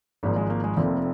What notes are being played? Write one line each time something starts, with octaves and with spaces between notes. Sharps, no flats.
G#1 G#2 F3 A#3
G#3
A#3
G#3
F1 F2 C3 F3 A#3